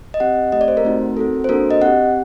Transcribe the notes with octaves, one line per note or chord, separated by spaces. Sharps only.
D#5
C4 G4 F#5
A3 C4 G4 D#5
D5
C5
A#4
A3 C4 D#4 F#4
C4 F#4 A4
C5
A#3 D4 F#4 A4 A#4
D#5
C4 G4 F#5